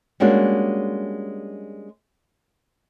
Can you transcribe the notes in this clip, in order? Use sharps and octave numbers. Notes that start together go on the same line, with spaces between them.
G3 G#3 A#3 C#4 D4 F#4